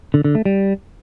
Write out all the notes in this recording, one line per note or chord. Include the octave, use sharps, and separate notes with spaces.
D3
D3
A3
G3